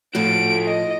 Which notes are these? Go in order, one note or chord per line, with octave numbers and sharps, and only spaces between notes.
A2 F3 F4 F#4 A4 D7
D#5